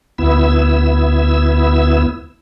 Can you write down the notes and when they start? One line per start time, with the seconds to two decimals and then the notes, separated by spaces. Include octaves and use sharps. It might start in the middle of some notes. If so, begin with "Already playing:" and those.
0.18 D2 B3 E4 E6